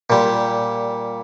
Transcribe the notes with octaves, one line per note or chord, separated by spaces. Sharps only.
A#2 G3